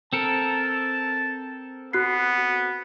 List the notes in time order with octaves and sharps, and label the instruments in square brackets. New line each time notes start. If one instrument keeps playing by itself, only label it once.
[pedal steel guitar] C4 A4 A#4 [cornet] A5
[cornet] B3 [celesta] F#4 F#6 C7